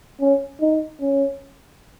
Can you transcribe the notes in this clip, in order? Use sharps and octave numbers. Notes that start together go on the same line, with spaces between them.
C#4
D#4
C#4